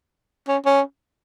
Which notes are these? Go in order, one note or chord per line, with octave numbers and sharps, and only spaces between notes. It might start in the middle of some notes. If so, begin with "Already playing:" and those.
C#4
C#4